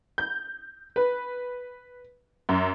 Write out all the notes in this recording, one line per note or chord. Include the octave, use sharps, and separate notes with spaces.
G6
B4
F#2